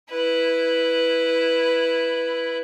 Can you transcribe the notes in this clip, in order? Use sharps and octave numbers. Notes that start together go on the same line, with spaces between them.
E4 B4